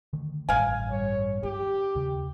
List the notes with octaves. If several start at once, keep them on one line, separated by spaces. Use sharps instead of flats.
D3 D#3 A3
A1 G2 F5 G#5
G3 C#5
D4 G4
D#2 C#3